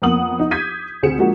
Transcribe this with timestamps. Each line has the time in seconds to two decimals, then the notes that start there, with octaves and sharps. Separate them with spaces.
0.02 F2 A#3 B3 F#5 D#6 F#7
0.39 D#4
0.51 D6 G6 G#6 B6 D#7
1.03 D2 C4 G#4 C#7 E7
1.18 F3 G#3 A#3 D4 F#4